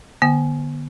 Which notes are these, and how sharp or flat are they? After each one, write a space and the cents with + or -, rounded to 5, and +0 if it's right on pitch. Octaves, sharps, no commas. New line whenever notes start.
D3 +15 B3 -35 G5 +0